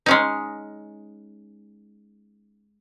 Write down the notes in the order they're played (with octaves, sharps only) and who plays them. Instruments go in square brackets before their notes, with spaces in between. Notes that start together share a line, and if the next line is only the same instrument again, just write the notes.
[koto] G#3 C#4 D#4